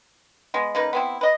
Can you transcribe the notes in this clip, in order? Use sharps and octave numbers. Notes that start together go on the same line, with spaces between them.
G#3 B3
C#3 A#3 D#4 B4
B3 C4 E4
B4 D#5